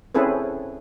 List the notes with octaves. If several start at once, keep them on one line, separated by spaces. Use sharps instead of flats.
C4 C#4 E4 G#4 A4 B4